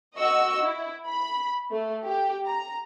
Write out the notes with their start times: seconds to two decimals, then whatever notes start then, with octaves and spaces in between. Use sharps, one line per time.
0.15 F#4 D#5 F#5 C#6 E6
0.61 E4
1.06 B5
1.71 A3
2.04 G4
2.47 A#5